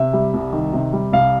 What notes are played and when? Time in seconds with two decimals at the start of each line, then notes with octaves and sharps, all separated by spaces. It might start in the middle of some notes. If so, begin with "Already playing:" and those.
Already playing: C3 E5
0.13 G3
0.34 C2
0.52 D#3
0.73 C3
0.93 G3
1.13 C2 F5